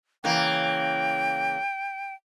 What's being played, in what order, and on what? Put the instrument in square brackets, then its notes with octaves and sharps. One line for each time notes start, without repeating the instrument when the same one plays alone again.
[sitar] C#3 E3 A#3 [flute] G5